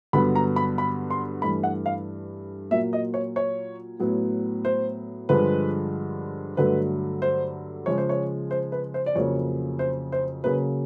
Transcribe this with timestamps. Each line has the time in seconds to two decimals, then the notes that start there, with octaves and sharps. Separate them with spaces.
0.13 G2 D3 F#3 B3 B5
0.35 A#5
0.56 B5
0.78 B5
1.11 C6
1.42 G2 E3 A3 B5
1.63 F#5
1.86 F5
2.71 A#2 F#3 A#3 E5
2.93 D#5
3.14 C#5
3.36 C#5
4.00 A2 F#3 B3
4.65 C5
5.29 G2 D3 F3 G#3 B4
6.57 G2 D3 F#3 A3 B4
7.22 C5
7.86 C#3 F3 G#3 C#5
7.98 C5
8.09 C#5
8.51 C5
8.72 B4
8.94 C5
9.06 D5
9.16 F2 C#3 F#3 A#3 C#5
9.79 C5
10.12 C5
10.44 C#3 F#3 A#3 B4